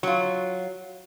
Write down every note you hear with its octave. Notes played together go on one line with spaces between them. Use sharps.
F#3 F4